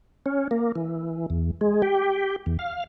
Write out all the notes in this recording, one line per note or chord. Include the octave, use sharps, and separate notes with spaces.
C#4
A#3
E3
E2
G#3
G4
E2
F5